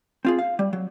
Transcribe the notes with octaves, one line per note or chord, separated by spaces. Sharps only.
C4 F4 G#4
F5
G3
F#3